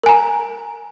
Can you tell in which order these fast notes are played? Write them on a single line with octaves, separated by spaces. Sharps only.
A#4 G#5 A#5